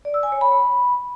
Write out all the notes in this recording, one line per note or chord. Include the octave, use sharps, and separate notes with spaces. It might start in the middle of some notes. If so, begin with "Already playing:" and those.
D5
E6
G#5
C#5
B5